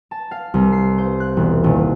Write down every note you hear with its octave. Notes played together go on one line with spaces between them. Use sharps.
A5
F5
C2
C7
C5
F#6
E1
D#1